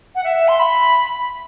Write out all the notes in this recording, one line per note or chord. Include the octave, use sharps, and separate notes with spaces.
F#5
E5
C6
B5